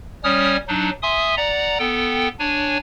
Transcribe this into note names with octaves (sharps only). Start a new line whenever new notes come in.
G3 C#4 C#5 D#6 F6
F#3 D4 D#4
E5 G#5 C6 D#6
D5 F#5 A#5
B3 A4 G5
D4 C#5 G#5